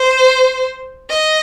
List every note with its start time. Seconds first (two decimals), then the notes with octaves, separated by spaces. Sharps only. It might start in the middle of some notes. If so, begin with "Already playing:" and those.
Already playing: C5
1.09 D#5